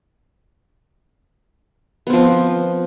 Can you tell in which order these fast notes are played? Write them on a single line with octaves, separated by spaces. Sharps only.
B3 C4 F3